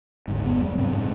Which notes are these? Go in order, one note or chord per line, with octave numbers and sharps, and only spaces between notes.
G1 D2 G#2
G1 E2 B3
F#3 G#3
A1 G2 C3 C4
A2 G#3